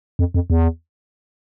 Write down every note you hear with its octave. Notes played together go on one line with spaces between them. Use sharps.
F2
F2
E2